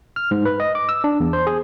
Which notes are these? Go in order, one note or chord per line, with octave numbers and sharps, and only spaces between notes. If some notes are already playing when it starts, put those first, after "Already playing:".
F6
G#2
B4
D#5
D6
E6
D4
E2
C5
G#4